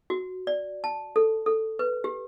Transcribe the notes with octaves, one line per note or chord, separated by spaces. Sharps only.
F#4
D5
A5
A4
A4
B4
G4